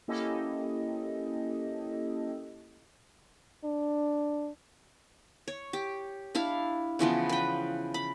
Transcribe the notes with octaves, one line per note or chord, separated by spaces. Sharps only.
A#3 C#4 E4 G4 A4 D#5
D4
C#5
G4
D4 E4 F5
C#3 E3 F3 B3
B4 G5
B5